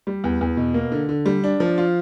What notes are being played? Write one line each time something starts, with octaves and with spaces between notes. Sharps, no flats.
G3
E2
E2
B2
A#3
D3
D3
G3
D4
F3
F4